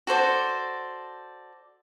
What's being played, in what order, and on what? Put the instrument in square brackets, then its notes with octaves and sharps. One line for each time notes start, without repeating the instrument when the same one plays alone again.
[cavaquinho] F#4 A4 C5 D5